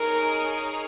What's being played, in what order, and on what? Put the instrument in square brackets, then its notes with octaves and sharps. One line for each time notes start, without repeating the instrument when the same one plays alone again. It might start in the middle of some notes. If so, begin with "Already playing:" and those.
Already playing: [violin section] D#4 G#4 C#5 [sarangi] A#4